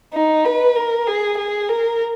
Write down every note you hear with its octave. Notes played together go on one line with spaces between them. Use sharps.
D#4
B4
A#4
G#4
G#4
A#4